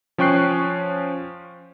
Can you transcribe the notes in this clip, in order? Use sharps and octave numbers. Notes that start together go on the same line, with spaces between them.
F3 C#4 G5 C#6 F#6 C7